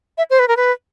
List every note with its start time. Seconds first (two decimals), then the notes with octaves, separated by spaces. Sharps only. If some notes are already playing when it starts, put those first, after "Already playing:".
0.18 E5
0.30 C5
0.39 B4
0.48 A#4
0.57 B4